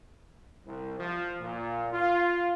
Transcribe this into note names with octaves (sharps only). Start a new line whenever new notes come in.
C2
F3
A#2
F4